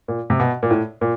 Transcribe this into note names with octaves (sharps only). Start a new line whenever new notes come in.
A#2
C3
B2
A#2
A2
A#2